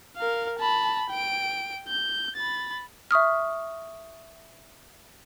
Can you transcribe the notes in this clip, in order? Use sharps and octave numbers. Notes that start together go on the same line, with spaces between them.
A#4 F5
A5 B5
G5 D7
G6
B5 A6
E5 C#6 D#6 F6